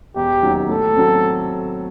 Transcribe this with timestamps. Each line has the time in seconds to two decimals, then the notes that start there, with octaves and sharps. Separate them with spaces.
0.16 E1 G4
0.43 D#2 D#3 F#3
0.69 A2 A4
0.96 F#3 A3 C4